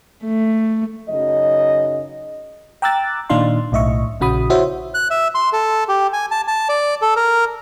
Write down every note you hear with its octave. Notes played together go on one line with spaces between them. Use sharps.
A3
F#2 C#3 F#3 D#4 D#5
G5 A#5 D6 E6 F#6 A6
A#2 D#3 D4 D#4 F5 C6
B1 A2 D#5 E5 C#6
A#1 C#3 F#4 B5 D#6
E4 F#4 C5 C#5 E5
F#6
E5
C6
A4
G4
G#5
A5
A5
D5
A4
A#4